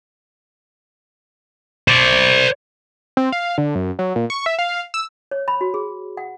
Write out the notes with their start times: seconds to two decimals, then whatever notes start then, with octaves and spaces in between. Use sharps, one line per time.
1.88 C5 D5
3.17 C4
3.32 F5
3.58 D3
3.75 F#2
3.99 F#3
4.16 A#2
4.30 C#6
4.46 E5
4.59 F5
4.94 E6
5.31 C#5
5.48 B5
5.61 F#4
5.74 G#4
6.17 F#5